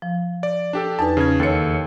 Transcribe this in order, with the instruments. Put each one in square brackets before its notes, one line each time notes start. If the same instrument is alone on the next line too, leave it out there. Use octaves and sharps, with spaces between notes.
[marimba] F3
[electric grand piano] D5
D4 G4 A4
[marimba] E2 D#4 B4 [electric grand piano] A5
[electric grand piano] C#3 C#4 G#6
[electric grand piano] D#2 A4 C#7 [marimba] C#5 A6